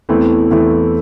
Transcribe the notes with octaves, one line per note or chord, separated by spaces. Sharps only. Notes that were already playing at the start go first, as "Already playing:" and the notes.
E2 E3 A3 C4 E4
E2 E3 A3 C4 E4